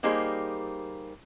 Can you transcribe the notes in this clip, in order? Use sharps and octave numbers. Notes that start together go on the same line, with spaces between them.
G3 A#3 D#4 G4 G#4 C5